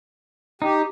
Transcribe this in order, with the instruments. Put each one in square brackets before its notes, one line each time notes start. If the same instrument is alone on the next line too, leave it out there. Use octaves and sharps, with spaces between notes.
[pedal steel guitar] D#4 [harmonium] G4